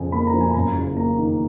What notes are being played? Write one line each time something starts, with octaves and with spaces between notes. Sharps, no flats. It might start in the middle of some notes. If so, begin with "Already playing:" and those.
Already playing: F2 C#3 G#5
A#3 B5
A#5
F3
G#5
B5
F#2 A#5
F#1
A#3 A#5
D#3